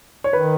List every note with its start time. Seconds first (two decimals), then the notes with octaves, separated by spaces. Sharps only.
0.24 C#5
0.33 D#3 B4